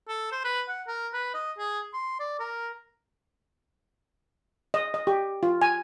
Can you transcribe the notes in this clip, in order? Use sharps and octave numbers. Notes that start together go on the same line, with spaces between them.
A4
C5
B4
F#5
A#4
B4
D#5
G#4
C6
D5
A#4
D#5
D#5
G4
F4
G#5